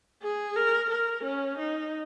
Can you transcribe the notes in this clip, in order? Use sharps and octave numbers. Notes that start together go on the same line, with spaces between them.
G#4
A#4
A#4
C#4
D#4